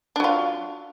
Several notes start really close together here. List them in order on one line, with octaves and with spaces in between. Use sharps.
D4 F#3 F4